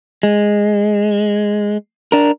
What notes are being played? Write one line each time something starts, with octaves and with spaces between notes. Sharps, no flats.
G#3
D4 A#4